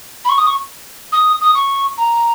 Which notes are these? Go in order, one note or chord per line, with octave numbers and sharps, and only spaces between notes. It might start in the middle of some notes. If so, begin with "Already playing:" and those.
B5
C#6
D#6
C#6
D#6
D#6
C#6
A#5